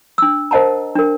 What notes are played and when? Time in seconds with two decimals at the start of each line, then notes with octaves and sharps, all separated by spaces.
0.18 D4 E6
0.51 A#4 C5 D#5 F#5 A5 A#5
0.95 D4 A#4